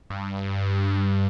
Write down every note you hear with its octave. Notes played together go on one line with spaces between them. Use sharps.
G2